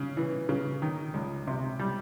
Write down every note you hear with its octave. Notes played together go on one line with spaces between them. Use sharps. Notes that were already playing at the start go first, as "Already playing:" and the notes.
Already playing: C#3
E3
C#3
D#3
C#2
C3
G3